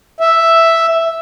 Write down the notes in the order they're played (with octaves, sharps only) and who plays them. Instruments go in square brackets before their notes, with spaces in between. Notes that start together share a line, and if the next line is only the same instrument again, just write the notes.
[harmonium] E5